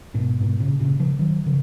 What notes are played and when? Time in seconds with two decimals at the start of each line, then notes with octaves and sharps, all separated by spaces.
0.14 G#2 B2
0.41 G#2 B2
0.60 A#2 C#3
0.80 A#2 C#3
1.00 C#3 F3
1.19 D#3 F#3
1.46 C#3 F3